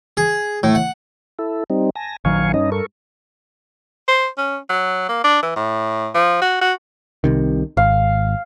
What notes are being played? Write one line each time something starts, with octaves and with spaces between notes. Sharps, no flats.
G#4
A2
F#5
E4 A4
G3 C4 D#4
G#5 A5 A#6
A#1 D#3 F#3 F5 G#5 C#6
G2 C#4 D#4 D#5
A4 A#4 C#6
C5
C#4
F#3
A#3
D4
E3
A2
F3
F#4
F#4
C2 C3 D#3
G#1 F5